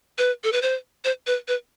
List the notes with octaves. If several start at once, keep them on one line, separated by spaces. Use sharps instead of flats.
B4
A4
B4
C5
C5
B4
B4